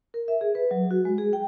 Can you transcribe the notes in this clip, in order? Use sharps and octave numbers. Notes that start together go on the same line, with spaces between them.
A#4
E5
G#4
B4
F#3
F#4
G#3
G#4
G5